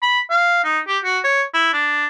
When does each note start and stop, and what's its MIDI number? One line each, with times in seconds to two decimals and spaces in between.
0.02 0.20 83
0.30 0.62 77
0.64 0.79 63
0.87 0.98 67
1.04 1.19 66
1.24 1.42 73
1.54 1.69 64
1.73 2.07 62